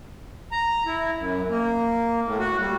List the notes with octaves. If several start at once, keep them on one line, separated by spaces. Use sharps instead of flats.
A#5
E4
F#2
A#3
A2
F#4
G3